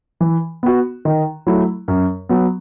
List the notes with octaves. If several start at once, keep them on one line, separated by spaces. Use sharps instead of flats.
E3
B3 F#4
D#3
F#3 A3 E4
F#2
F#3 B3